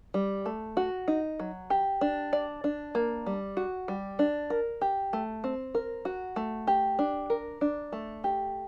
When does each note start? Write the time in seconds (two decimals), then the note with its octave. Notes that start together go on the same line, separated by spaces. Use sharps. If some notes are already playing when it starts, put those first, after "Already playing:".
0.14 G3
0.46 A3
0.77 F#4
1.08 D#4
1.40 F#3
1.70 G4
2.01 D4
2.33 D5
2.64 D4
2.95 A#3
3.26 G3
3.57 F#4
3.88 G3
4.19 D4
4.50 A#4
4.81 G4
5.13 A3
5.44 C4
5.75 A#4
6.05 F#4
6.36 A3
6.67 G4
6.99 D4
7.30 A#4
7.61 D4
7.93 A3
8.24 G4